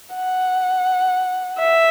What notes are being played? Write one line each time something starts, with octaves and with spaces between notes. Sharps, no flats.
F#5
E5